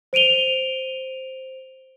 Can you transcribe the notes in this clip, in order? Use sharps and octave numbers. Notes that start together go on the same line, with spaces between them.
C5 D7 D#7 F7 G7